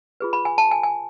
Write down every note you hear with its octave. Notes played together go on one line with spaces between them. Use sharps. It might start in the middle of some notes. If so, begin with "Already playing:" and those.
F4 G#4 B4
B5
G#5
A5
G#5
G#5